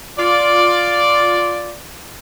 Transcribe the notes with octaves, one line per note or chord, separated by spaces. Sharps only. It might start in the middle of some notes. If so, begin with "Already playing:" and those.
F4 D5